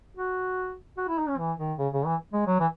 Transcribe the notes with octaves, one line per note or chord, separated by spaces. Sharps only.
F#4
F#4
E4
D#4
C#4
E3
D#3
C#3
C#3
E3
G#3
F#3
E3